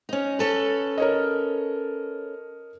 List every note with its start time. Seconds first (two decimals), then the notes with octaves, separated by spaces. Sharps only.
0.09 C#4 D#4
0.39 C#4 A4 B4
0.98 A#4 C#5 D#5